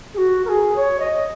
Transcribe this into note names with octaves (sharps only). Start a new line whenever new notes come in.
G#4
F#4
A#4
G#4
C#5
D#5